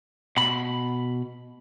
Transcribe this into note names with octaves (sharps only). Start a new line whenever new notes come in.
B2 B5